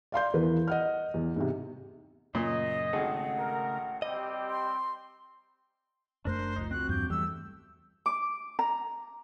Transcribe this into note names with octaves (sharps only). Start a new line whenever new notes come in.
D5 F5 C6 G6
E2 E3 A#4 B4
D#5 F#5 F6
E2
G#2 C3
F#2 A#2 C#3 D#5
G#1 C#3 A3 G#4 A4 F#5
A#4
G3 C4 G4 D#5
C6
F#1 F#2 A3 D4 A#4 C5 F#6
C#2 F3 D#4
C4 F#4 F#6
E2 G2 D6 G6
E2 G3 A3 G4 E6
D6
A#5